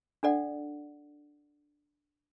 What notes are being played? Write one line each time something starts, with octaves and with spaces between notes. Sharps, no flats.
D4 A4 D5 F#5